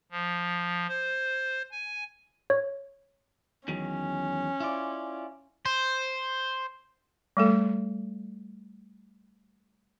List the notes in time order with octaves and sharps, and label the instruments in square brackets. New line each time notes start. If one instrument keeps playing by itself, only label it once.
[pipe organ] F3
C5
G#5
[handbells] C#5
[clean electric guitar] E2 D#3 F#3 [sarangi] C#4
[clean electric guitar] E4 F4 D5
[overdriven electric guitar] C5
[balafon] G3 A3 A4